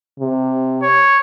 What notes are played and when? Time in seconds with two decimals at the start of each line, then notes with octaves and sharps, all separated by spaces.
0.19 C3
0.83 C#5